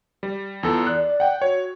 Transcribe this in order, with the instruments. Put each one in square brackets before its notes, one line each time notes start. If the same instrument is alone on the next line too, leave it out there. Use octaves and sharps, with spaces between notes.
[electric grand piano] G3
[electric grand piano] E2 A4 [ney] F4
[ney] D5 [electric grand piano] F#6
[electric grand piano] F#5 G5
[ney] F#4 [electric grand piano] C#5